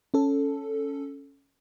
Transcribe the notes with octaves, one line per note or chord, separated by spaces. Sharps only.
C#4 A4